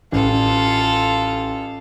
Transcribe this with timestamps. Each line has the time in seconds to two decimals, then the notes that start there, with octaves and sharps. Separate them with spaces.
0.12 A1 F4 A4